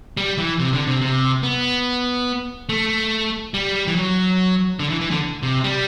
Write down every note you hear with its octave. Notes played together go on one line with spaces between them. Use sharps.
G3
E3
C3
D3
C3
C3
B3
A3
G3
E3
F#3
D3
E3
E3
D3
C3
G3